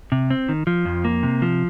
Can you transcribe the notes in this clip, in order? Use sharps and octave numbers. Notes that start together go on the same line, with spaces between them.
C3
C4
D#3
F3
F2
A#3
C3
F3